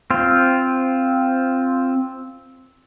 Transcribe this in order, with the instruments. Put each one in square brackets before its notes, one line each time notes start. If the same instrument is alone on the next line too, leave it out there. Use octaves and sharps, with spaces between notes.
[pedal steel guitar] C4 F4